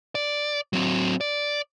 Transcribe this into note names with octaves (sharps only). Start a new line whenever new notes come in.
D5
F#3 C4
D5